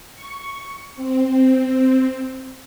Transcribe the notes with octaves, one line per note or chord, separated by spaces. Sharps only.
C#6
C4